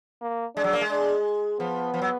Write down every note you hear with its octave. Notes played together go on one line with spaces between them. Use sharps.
A#3
G#3 D4
F#3
A#3
G#3
D4
F3 B3
F3
F#3